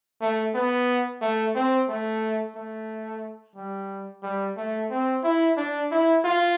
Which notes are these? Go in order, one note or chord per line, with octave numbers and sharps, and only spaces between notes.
A3
B3
A3
C4
A3
A3
G3
G3
A3
C4
E4
D4
E4
F4